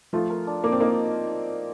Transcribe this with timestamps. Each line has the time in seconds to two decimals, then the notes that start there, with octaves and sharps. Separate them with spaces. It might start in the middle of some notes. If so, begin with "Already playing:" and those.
0.13 F3 A3 F4
0.30 A#4
0.47 D4
0.64 A#3 D5
0.72 C4
0.80 A#3 D#4